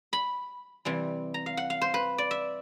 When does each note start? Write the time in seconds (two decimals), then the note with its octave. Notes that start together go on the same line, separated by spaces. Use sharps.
0.13 B5
0.85 C3 E3 G3
1.34 A#5
1.46 F5
1.57 F#5
1.70 F5
1.81 C5
1.94 B4
2.18 D5
2.31 E5